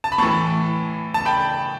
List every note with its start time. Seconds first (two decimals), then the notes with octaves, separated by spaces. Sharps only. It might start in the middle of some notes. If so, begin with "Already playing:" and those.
0.04 A5
0.12 B5
0.18 A2 E3 A5 C#6
1.14 A5
1.25 G5 B5